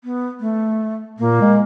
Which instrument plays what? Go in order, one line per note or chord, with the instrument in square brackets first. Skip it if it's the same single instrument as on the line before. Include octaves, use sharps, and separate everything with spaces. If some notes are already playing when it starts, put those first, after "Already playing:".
[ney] B3
A3
[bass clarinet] A#2 [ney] A#3
[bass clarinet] G#3